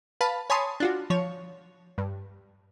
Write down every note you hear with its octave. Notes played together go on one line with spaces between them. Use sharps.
B4 F5 A5 B5
C#5 G#5 A5 B5 C6 D#6
D4 F4 F#4
F3 C#5
G2